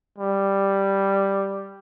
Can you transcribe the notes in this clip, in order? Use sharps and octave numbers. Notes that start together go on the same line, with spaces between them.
G3